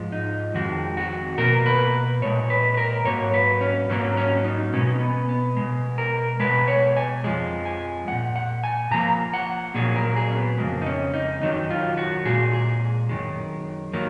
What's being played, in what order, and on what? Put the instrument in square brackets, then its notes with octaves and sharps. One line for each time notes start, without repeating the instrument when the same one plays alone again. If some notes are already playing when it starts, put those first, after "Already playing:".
Already playing: [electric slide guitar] G#2 F3 G#3
D#4
F2 D#3 G#3 F#4
F#4
B2 A#3 A#4
B4
A#2 G#3 C#5
B4
B4
A#4
G#2 F#3 A#3 C#5
B4
C#4
G#2 F#3 A#3 C#4
C#4
D#4
B2 G#3 C#4
B3
B3
B2 G#3
A#4
B2 G#3 B4
C#5
G#5
F2 F3 G#3
G#5
A#2 G#3 F#5
F#5
G#5
A#2 F3 A#3 A#5
F#5
A#2 F#3 A#3 G#4
A#4
G#4
C#4
B3
F2 C#3 G#3 A#3
D#4
C#4
D#4
F#2 D#3 F#3 D#4
F4
F#4
A#2 G#3 G#4
G#4
F#2 D#3 G#3
D#3 F#3 A#3